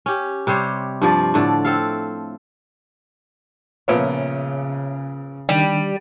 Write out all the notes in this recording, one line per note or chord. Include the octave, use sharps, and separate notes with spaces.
C#4 G4
C3 G3 C5 C#5
G2 F3 D5
A2 D3 A3 D5
C4 A4 F5
A#2 C#3 F3 B3 C#5 E5
D#3 G3 D4